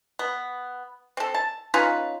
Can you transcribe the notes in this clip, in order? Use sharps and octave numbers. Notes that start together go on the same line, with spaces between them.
B3
C4 A4
A5
C#4 D#4 F4 B4